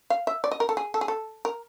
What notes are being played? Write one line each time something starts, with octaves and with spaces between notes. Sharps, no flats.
F5
E5
D5
D#5
A#4
A4
G#4
A4
G#4
A4
A#4